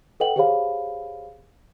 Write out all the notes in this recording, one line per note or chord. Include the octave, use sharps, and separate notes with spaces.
A4 B4 D#5 F#5 G5 F#7
G4 G#4 C5 C#5 F5 B5